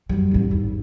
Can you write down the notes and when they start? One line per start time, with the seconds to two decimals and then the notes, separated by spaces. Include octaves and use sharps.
0.09 F#2 G3
0.31 A1 E2
0.51 G#1